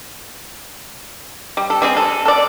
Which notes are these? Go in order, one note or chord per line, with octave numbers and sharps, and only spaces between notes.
G3
A4
G3 C4 G#4
A4
A4 D5